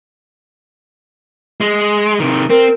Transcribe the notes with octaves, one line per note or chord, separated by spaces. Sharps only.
G#3
C3 D#3
C4 A#4